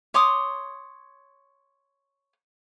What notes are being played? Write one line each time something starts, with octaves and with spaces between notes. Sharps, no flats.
C#5 C6 D6 D#6